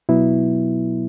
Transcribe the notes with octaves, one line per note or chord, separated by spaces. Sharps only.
B2 F#3 B3 E4